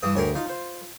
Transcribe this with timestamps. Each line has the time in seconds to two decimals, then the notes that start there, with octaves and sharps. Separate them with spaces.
0.02 G2 E3 D#6
0.15 D2 G4 G#4 A#4 C#5
0.35 D#4 F4
0.50 C5